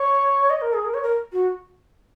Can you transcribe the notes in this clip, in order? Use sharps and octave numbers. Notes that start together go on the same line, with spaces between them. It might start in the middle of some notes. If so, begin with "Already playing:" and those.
Already playing: C#5
D#5
A#4
G#4
A#4
C#5
A#4
F#4